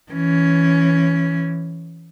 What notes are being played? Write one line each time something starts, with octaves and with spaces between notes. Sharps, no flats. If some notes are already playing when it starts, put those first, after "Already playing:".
E3 C#4